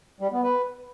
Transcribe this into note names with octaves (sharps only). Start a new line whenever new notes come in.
G3
B3
B4